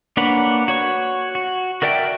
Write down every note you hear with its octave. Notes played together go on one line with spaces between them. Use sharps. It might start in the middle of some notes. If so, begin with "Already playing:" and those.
A#3 D4 B4 C#5 F#5
F#4 C#5 C#6
F#4
F#4 A#4 D5 E5 G5